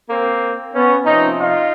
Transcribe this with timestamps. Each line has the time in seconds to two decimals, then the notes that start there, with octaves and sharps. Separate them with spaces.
0.10 A#3 C4
0.74 B3 C#4
1.06 C3 F3 C#4 D#4
1.39 D#4 F4